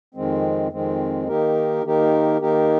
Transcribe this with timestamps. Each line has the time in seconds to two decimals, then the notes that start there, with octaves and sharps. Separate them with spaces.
0.14 F2 D#3 G#3 C4
0.72 F2 D#3 G#3 C4
1.28 D#3 A#3 D#4 G4 A#4
1.84 D#3 A#3 D#4 G4 A#4
2.41 D#3 A#3 D#4 G4 A#4